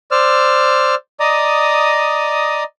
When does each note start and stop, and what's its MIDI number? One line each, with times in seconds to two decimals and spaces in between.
0.11 0.95 72
0.11 0.95 74
0.11 0.95 88
0.11 0.95 89
1.20 2.64 74
1.20 2.64 75
1.20 2.64 82
1.20 2.64 87